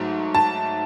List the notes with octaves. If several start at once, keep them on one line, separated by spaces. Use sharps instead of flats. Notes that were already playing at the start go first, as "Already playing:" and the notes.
Already playing: G#2 F#3 A3
A5